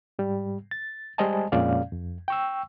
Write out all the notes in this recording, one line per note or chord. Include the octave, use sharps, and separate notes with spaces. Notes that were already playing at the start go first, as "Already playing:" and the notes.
G#2 G3
A6
G3 G#3 C5 D#5 G#5 A5
F2 A#2 G#3 C#4 D5 F5
F2
G5 C#6 E6